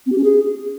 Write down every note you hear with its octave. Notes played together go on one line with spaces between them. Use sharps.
C4
G4
C#4
G#4